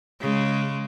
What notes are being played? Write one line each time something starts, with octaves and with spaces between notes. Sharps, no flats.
C#3 G#3